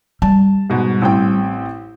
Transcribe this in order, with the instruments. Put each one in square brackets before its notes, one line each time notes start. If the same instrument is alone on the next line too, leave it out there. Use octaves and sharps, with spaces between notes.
[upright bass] G3 [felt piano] A5
[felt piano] G#2 B2
A1 C4 G5